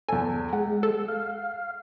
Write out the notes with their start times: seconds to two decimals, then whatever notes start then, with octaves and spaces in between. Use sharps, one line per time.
0.09 E2 A4 G#5
0.53 G#3 F#5
0.83 A4
1.08 F5